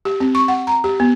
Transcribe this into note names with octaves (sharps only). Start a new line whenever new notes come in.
G4
C4
C#6
F#5
A#5
G4
B3